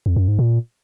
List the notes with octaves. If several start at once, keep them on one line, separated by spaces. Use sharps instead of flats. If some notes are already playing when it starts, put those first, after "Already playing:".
F2
F#2
G#2
A#2